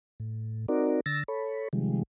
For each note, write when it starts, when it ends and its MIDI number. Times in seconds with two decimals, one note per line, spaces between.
0.20 0.66 45
0.68 1.00 60
0.68 1.00 63
0.68 1.00 66
0.68 1.00 70
0.68 1.00 74
1.06 1.23 50
1.06 1.23 88
1.06 1.23 93
1.06 1.23 94
1.28 1.68 69
1.28 1.68 73
1.28 1.68 83
1.73 2.03 48
1.73 2.03 51
1.73 2.03 53
1.73 2.03 55
1.73 2.03 56